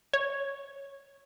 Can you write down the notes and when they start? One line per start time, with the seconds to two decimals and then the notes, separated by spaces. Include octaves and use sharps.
0.13 C#5